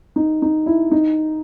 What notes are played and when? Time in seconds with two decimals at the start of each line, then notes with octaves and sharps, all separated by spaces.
0.16 D#4
0.42 D#4
0.66 E4
0.91 D#4